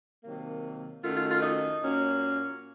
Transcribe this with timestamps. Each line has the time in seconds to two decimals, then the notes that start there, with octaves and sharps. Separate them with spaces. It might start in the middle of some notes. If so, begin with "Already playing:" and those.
0.24 C3 D#3 F#3 A#3
1.03 F#2 D#3 A3 F4
1.17 F4
1.31 F4
1.43 D#4
1.83 A#2 F#3 A#3 C#4